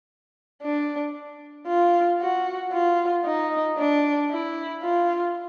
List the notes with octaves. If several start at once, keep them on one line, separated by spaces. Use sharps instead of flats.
D4
F4
F#4
F4
D#4
D4
E4
F4